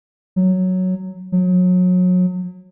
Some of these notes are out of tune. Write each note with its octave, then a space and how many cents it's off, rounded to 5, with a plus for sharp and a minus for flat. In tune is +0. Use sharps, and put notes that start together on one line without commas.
F#3 +0
F#3 -30